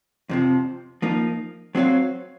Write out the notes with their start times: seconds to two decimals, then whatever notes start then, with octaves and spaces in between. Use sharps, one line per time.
0.29 F2 C3 F3
1.02 F3 A#3 D#4
1.75 F#3 C4 F#4 C#5 F5